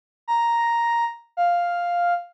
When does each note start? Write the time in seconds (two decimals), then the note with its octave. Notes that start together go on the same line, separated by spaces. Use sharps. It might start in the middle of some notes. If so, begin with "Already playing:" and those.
0.28 A#5
1.37 F5